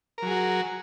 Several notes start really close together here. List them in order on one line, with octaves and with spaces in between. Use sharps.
A#4 F#3 G#4 F#4